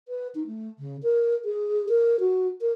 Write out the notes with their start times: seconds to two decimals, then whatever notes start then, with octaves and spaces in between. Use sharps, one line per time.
0.08 B4
0.35 D#4
0.47 A3
0.79 C#3
1.03 A#4
1.45 G#4
1.89 A#4
2.20 F#4
2.61 A#4